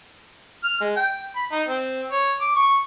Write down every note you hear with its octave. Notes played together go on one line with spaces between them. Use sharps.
F6
G#3
G5
B5
D#4
C4
C#5
D6
C#6